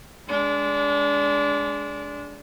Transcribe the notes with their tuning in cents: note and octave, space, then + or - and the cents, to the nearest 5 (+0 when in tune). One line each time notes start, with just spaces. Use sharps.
G#3 +0 D4 -25